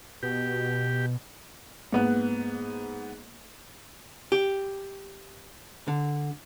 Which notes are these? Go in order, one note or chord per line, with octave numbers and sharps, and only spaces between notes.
B2 G4
G#2 A#3 B3 F#6
G4
D3